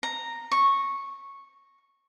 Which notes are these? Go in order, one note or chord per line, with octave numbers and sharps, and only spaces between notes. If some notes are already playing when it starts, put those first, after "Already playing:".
A#5
C#6